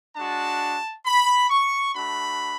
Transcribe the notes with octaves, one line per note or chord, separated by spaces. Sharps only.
G#3 D4 F#4 A5
B5
C#6
A3 D4 F#4 B5